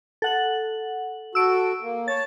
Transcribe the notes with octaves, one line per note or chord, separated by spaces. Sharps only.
A4 F#5 F#7
F#4 A4 E6 D7
A#3
C#5 A5 A6